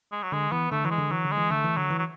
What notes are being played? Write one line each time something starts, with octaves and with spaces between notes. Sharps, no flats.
G#3
F#3
D3 G#3
E3 B3
D3 A3
E3 F#3
G#3
D3
E3 F#3
D3
G#3
E3
D3 A3
E3
D3 F#3
E3
F#3